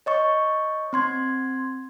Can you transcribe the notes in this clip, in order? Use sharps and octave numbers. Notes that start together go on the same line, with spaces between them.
C#5 D#5 C#6
C4 C6 G#6